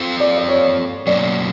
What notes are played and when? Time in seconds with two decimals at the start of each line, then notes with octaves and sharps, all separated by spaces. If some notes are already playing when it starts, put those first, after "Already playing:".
Already playing: C4 F4 A4 C5
0.20 D5
0.37 D5
0.48 C#5
1.07 B2 F#3 A#3 C#4 D5